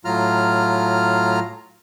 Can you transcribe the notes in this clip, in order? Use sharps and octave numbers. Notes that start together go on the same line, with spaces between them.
A2 F#3 F4 A#5 F6